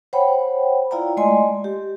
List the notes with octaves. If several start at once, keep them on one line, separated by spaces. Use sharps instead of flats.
C5 C#5 F#5 G5 B5
E4 F4 D5 F5 G5 A#5
G#3 A3 D5 D#5 G#5 C6
G4